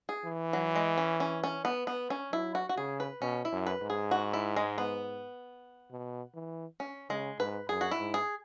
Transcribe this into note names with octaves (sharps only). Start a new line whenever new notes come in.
G#4
E3
F#3
G#3
C#4
C#4
C#4
B3
B3
C#4
F#3 E4
F#4
F#4
C#3 G#4
B4
B2 C#4
E4
F#2
B4
G#2
G#4
F#4
E4
G#3
B3
B2
E3
C#4
C#3 G#3
G#2 B4
F#2 G#4
F#4
E4
G#2
G#4